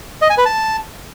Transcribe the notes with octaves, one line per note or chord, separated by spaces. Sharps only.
D#5
G#5
B4
A5